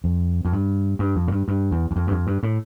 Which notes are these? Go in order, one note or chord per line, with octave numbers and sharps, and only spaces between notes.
F2
F2
G2
G2
F2
A2
G2
G2
E2
E2
F2
G2
F2
G2
A2